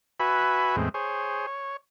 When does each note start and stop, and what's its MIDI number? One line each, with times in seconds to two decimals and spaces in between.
0.20 0.76 66
0.20 0.76 71
0.20 0.76 76
0.20 0.76 80
0.20 0.76 83
0.76 0.89 40
0.76 0.89 45
0.76 0.89 56
0.76 0.89 60
0.94 1.46 68
0.94 1.46 72
0.94 1.46 73
1.47 1.77 73